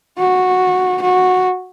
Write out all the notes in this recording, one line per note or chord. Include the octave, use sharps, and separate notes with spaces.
F#4
F#4